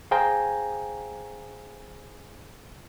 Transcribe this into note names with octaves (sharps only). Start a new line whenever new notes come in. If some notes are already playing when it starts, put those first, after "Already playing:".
G#4 C5 F5 G5 G#5 A#5